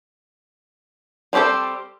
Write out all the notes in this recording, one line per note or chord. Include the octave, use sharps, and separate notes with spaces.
G3 C4 G4 A4 C5